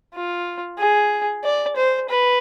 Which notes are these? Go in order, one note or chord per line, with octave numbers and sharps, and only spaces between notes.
F4
G#4
D5
C5
B4